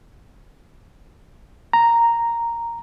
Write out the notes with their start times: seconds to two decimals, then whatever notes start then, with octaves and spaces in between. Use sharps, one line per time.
1.73 A#5